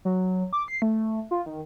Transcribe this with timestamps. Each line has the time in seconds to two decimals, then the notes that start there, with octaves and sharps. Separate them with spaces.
0.05 F#3
0.53 D6
0.68 C7
0.82 A3
1.31 F4
1.46 D#3